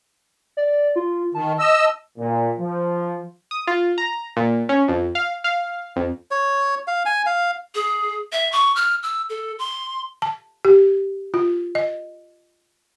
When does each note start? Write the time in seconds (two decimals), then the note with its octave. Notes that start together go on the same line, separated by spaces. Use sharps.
0.57 D5
0.96 F4
1.35 D#3 A5
1.59 D#5 E6
2.18 A#2
2.59 F3
3.51 D#6
3.67 F4
3.98 A#5
4.37 A#2
4.69 C#4
4.88 F2
5.15 F5
5.44 F5
5.96 F2
6.31 C#5
6.87 F5
7.06 G#5
7.26 F5
7.75 G#4
8.32 E5
8.52 C#6
8.76 F6
9.03 E6
9.30 A4
9.59 C6
10.22 A5
10.65 G4
11.34 F4
11.75 D#5